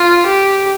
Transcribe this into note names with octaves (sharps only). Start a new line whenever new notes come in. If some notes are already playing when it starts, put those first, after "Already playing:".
Already playing: F4
G4